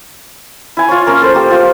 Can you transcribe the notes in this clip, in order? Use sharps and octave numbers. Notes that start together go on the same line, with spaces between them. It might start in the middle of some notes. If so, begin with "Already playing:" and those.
E4 G#5
F4 C#5
A#3 C#4 A#4
A4 C5
A#3 G4
F4